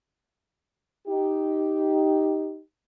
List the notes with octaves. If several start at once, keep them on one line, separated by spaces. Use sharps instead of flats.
D#4 G4